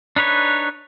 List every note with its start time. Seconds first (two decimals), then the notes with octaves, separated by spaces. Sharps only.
0.16 D4 D#4 B4 C#5